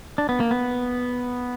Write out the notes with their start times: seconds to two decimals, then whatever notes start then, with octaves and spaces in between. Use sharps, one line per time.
0.18 D4
0.29 B3
0.40 A#3
0.51 B3